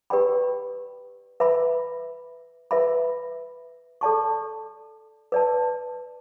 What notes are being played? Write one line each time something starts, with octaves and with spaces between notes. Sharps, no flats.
G4 B4 D5 G5 B5
B4 E5 B5
B4 E5 B5
A4 D5 A5 C#6
B4 D5 A5